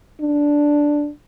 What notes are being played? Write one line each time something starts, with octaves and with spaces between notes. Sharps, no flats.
D4